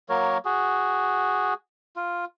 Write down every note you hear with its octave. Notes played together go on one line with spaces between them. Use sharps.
F#3 A#3 A#4 C#5
F#4 G#4
F4